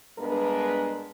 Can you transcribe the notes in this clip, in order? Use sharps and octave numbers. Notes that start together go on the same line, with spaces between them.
G2 G#3 B3 D4 A#4 B4